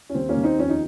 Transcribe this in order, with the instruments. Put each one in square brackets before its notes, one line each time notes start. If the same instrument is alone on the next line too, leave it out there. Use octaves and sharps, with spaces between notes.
[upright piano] C#4
D#2 C4
A#3 C#4
D#2
C4 D#4
F2 C#4
D#4